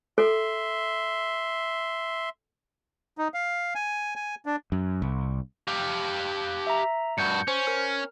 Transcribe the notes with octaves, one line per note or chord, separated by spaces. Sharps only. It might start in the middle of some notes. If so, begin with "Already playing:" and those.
A4 E5 C6
D#4
F5
G#5
G#5
D4
F#2
C2
G4 F5
E5 A#5
G2 F#4 G6 C#7
C#4 C5
A#4 F6